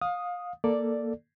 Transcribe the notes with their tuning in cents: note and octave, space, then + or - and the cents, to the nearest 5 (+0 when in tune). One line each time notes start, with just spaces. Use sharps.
F5 +25 D#6 +0
A#3 +0 A4 +5 D5 +0